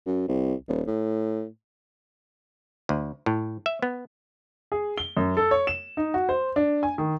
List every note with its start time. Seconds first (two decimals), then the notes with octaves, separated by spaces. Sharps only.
0.06 F#2
0.28 C2
0.68 D#1
0.87 A2
2.89 D2
3.26 A2
3.66 E5
3.82 B3
4.72 G#4
4.98 G7
5.17 F#2
5.37 A4
5.51 C#5
5.67 E7
5.97 D#4
6.14 F#4
6.29 C5
6.56 D4
6.83 G#5
6.98 D#3